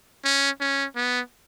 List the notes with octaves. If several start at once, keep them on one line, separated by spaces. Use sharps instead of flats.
C#4
C#4
B3